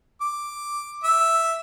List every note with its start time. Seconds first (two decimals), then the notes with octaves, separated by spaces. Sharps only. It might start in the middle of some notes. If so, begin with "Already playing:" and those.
0.21 D6
1.04 E5